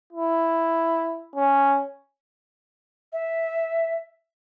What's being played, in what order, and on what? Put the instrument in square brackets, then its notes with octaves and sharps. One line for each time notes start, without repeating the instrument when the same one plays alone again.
[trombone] E4
C#4
[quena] E5